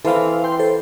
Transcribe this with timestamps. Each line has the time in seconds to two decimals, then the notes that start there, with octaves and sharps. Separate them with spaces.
0.05 E3 C4 A4 C5 F5
0.44 G5 C6
0.59 A4 C5